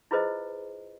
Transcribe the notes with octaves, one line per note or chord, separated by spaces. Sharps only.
E4 F4 G#4 B4 C5 D#5